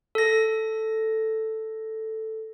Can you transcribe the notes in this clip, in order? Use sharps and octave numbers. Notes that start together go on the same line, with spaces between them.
A4 A#6